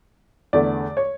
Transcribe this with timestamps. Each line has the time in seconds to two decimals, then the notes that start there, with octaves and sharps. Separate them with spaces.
0.53 E2 D3 A3 D5
0.97 C#5